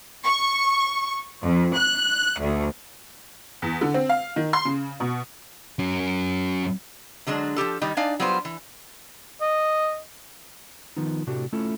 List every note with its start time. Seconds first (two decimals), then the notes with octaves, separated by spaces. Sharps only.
0.24 C#6
1.44 F2
1.76 F#6
2.41 D2
3.62 E2
3.81 D3
3.94 C4
4.09 F5
4.36 D#3
4.53 C6
4.65 C#3
5.00 B2
5.79 F#3 C#4
7.27 D3 F#3 G#3 D4
7.56 F3 F4 G4 A4
7.81 D#3 G3 D#4
7.97 D4 D#4 D5 F5 G#5
8.20 F#3 G3 B3 F4 B4 C5
8.45 E3
9.41 D#5
10.97 D#3 F3 B3 D#4
11.27 A2 C3 A3 D4 F#4 G4
11.53 A3 C#4 E4 F4 A4